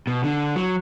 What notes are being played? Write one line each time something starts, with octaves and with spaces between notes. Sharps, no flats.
B2
D3
F#3